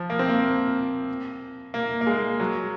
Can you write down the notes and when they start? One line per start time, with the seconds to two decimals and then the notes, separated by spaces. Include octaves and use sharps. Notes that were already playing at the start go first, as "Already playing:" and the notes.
Already playing: F3
0.10 A#3
0.19 C4
0.29 A#3
1.74 A#3
2.01 A#3
2.07 G#3
2.40 F#3